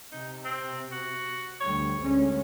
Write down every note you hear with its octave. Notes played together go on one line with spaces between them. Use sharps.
C3 D#4
C4
F#4
D2 G3 C#5
D2 G#3 C#4